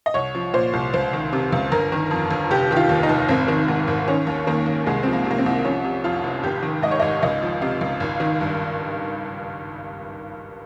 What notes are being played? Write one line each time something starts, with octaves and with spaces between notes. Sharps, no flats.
D#5
C2 C#5
F3
A#2 C5
C2
C#2 C5
D#3
C3
C#2
G1 A#4
D#3
F2
G1
F1 G4
D#3 G4
F4
D#2
D#4
F1
G#1 C4
D#3
G#2
G#1
D#3 C#4
D#2
D#3 A#3
D#2
C2 G#3
F3 C4
A#3
C3
A#3
C4
C2
F3 C#4
C3
F2 F4
F1
G#1 G4
D#3
G#2 D#5
C#5
G#1 D#5
C#2 D#5
F3
C3 F5
C#2
G#1
D#3
G2